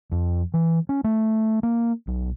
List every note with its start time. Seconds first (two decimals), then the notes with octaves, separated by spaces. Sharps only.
0.12 F2
0.54 E3
0.89 C#4
1.04 A3
1.63 A#3
2.07 B1